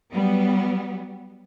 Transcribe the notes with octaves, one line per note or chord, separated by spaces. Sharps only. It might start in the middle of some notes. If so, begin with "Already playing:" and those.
F#3 G3 B3